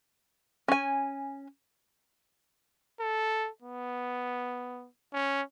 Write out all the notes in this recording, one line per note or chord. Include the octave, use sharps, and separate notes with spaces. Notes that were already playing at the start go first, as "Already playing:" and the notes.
C#4 G#5
A4
B3
C#4